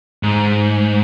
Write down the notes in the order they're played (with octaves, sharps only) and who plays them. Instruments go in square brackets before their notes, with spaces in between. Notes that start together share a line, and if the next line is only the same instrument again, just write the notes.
[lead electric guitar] G#2